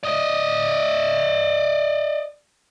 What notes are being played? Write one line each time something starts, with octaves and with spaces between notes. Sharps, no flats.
D5 D#5